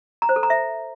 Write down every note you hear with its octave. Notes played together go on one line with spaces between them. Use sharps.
A#5
C5
A4
A#5
E5